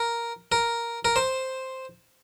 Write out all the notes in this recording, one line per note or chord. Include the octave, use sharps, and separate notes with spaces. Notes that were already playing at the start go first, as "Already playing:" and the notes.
Already playing: A#4
A#4
A#4
C5